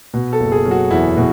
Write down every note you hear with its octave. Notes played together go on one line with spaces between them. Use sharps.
B2
A4
F#1
G#4
F#3
F#4
E2 E4
B2